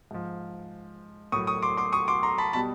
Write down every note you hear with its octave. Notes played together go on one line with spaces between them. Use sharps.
G#2 F3
A2 F#3 C#6 D#6
C#6 D#6
C6 D6
C6 D6
C#6 D#6
C6 D6
A#5 C6
A5 B5
B2 G3 A5 B5